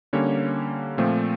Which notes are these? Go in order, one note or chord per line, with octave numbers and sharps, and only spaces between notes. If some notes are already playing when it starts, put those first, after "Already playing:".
D3 G3 A#3 C#4 C#5
A#2 F3 A3 C4